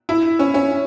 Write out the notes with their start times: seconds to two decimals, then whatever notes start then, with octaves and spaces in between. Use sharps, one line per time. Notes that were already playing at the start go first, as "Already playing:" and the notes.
0.09 E4
0.39 C#4
0.54 C#4